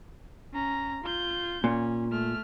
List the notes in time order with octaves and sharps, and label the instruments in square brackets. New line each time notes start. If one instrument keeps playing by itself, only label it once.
[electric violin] C#4 A#5
F4 G6
[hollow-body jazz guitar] A#2 [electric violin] C#4
[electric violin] A3 F6